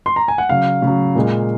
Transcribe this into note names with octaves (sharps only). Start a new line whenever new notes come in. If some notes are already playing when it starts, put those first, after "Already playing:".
C6
A#5
G#5
F#5
C#3 F#3 F5
C#3 F#3
A#2 G#3